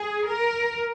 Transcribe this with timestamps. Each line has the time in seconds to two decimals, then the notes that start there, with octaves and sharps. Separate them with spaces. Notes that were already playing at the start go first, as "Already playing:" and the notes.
Already playing: G#4
0.28 A#4